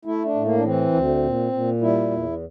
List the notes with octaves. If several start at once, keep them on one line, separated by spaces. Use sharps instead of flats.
A3 E4
D4
A2
A#3
D4
E3 C4
D2
A#2
A#2
G3 E4
E2